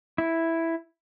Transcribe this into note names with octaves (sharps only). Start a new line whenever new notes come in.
E4